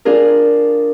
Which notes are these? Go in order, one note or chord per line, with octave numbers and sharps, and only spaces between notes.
D4 F4 G#4 A#4